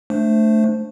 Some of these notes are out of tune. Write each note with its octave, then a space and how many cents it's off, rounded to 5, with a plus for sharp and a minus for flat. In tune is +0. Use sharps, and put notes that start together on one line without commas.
A3 +0 D4 +0 C5 +0